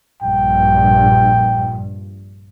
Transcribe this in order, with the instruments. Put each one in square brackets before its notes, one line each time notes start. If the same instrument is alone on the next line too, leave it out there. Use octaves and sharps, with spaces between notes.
[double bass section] A#1 G2 [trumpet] G5